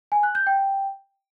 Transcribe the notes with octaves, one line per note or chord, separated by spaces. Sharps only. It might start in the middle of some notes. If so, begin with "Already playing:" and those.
G#5
F#6
G6
G5